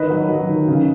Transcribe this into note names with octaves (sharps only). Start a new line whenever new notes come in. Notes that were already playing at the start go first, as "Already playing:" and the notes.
Already playing: D#3 B4 D#5
F#3
F#3
D#3
C#3